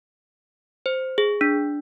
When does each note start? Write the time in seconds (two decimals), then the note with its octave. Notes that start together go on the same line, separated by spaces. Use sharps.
0.86 C5
1.18 G#4
1.41 D4